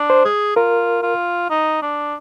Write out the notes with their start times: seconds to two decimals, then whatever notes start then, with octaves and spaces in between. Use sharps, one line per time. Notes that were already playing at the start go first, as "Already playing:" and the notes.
Already playing: D4
0.10 C5
0.25 G#4
0.56 F4 A#4
1.03 F4
1.50 D#4
1.82 D4